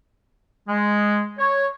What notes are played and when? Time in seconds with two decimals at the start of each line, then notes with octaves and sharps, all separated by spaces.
0.68 G#3
1.38 C#5